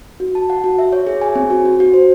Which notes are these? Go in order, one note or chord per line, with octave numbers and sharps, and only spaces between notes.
F#4
A5
F#5
F#4
E5
C#5
G#4
G#5
C4
F#4
F#4
F#4
C5